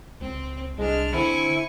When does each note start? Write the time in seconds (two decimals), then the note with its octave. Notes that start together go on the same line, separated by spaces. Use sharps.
0.21 C#2 C4
0.78 C2 G#3 D4 F6
1.14 D3 C4 E4 G#5 C#6